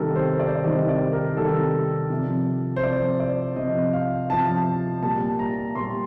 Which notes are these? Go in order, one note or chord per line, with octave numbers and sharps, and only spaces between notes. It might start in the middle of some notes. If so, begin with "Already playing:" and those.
Already playing: C3 D#3 G3 A4 A#4
C5
D5
C5
D5
C3 D#3 G3 D#5
D5
A#4
C3 D#3 G3 A4
C3 F3
C5
C3 F3 D5
D5
C3 F3 D#5
F5
C3 F3 A5
A#2 G3 A5
A#5
A#2 G3 C6